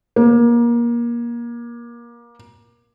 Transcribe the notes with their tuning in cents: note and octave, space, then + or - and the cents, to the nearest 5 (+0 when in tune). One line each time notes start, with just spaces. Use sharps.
A#3 +25